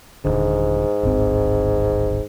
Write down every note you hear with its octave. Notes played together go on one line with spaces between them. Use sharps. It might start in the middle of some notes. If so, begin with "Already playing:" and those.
D#1 G#1 G#2 D3
D1 G#1 C4